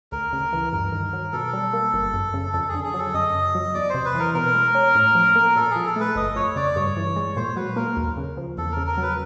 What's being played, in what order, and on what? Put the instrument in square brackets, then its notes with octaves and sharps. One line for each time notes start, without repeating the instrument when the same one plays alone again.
[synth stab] D2 [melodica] A#4
[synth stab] C#3
E3
[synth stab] G2 [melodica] A#4
[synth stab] D#3
F#3
[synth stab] B2 [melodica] A4
[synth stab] G3
A#3
G1
F#2
C#3
[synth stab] F2 [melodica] A4
[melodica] G#4
[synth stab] D3
[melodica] G#4
[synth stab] F#3
[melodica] A4
[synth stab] F#2 [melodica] D#5
[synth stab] C#3
F#3
[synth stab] E2 [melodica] D5
[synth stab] C3 [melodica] C5
[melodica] B4
[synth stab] E3
[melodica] A#4
[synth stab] B2 [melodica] A#4
[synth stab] G#3
C#4
A2
F3
A#3
[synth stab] A#2 [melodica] A4
[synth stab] F3 [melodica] G#4
[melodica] A4
[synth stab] A3 [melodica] B4
[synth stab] G1 [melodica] D#5
[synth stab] F2 [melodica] C#5
[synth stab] C#3 [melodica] D5
[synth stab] G2 [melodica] C#5
[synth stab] E3
G#3
[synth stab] A#2 [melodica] C5
[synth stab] F#3 [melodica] B4
[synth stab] A#3 [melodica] A#4
[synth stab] D#2
C#3
F3
[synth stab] E2 [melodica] A4
[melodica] A#4
[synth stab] C#3
[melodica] A#4
[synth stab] F#3 [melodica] B4